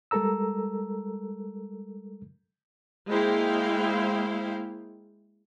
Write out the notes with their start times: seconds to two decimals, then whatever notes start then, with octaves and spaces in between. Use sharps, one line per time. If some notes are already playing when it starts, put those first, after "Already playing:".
0.11 G3 G#3 A4 A#4 A#5 E6
3.08 G#3 A#3 E4 C5 F5 G5